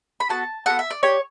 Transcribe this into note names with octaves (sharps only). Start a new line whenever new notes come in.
B5
B3 F#4 A4 A5
B3 F#4 A4 F#5
E5
D5
D4 G4 C#5